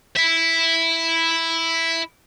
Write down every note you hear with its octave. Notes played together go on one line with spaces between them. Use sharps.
E4 E5